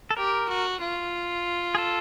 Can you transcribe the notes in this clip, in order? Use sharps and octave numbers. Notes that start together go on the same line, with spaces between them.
A4
G4 A#4
F#4
F4
G#4
A4